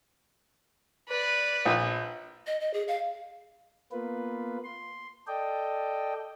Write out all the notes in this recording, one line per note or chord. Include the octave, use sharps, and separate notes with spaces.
B4 D5
A#1
D#5
D#5
G#4
F5
A#3 B3 F4 B4
C6
A4 D5 D#5 G5